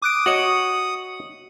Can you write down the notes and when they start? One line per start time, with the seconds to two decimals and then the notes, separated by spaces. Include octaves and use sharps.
0.02 D6 D#6 F#6 D7
0.26 F#4 C#5 D#5 C#7 F#7